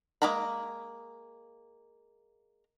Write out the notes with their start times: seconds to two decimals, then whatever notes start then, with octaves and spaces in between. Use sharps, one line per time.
0.22 G#3 A#3 A#4 A#5 B5